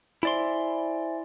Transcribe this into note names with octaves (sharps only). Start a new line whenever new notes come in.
E4 C5 D5 E5 G#5 C6